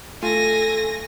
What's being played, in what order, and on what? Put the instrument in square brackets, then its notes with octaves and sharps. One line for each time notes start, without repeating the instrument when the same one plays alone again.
[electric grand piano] A3 F4 [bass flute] A4 [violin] G#5 A#6